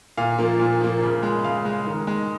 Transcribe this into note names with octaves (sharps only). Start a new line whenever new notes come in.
A#2 F5
F3 A#3
A#2
F3 A#3
C#3
G#3
C#3 F5
G#3
D#3
G#3